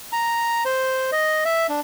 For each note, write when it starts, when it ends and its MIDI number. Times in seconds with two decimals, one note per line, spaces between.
0.12 0.64 82
0.65 1.11 72
1.12 1.44 75
1.45 1.67 76
1.69 1.80 62